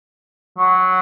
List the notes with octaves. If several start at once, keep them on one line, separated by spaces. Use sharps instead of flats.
F#3